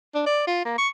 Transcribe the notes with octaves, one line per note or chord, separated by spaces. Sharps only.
D4
D5
F4
A#3
C#6